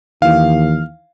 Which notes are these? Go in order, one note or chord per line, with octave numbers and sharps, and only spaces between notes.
D#2 D#3 E3 F5